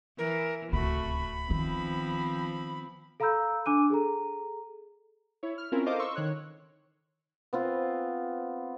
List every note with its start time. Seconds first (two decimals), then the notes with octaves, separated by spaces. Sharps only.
0.18 E3 A#4
0.73 D1 G#1 C#2 C3 A3 F#4 B5
1.50 D#3 F3 B3 C4
3.20 A4 F5 A#5 B5 E6 G6
3.66 D4 G#5 D6 F#6 D#7
3.90 G#4 A4 A#5
5.43 E4 C#5
5.58 F6
5.72 C4 C#4 E4 F4 A#4
5.86 A4 A#4 C5 D#5 F5 D6
5.99 C6 C#6 E6
6.15 D#3 C#5 F#6
7.53 B3 C4 F4